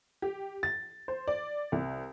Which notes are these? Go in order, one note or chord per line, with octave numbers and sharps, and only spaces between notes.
G4
A6
C5
D5
C2